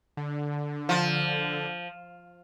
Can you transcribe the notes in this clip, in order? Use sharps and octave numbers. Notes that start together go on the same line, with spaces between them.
D3
F3